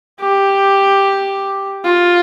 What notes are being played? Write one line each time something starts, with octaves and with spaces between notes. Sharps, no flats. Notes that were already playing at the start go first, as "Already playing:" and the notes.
G4
F4